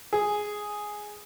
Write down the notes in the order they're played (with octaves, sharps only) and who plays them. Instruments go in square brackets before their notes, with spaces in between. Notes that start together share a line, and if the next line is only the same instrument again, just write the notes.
[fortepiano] G#4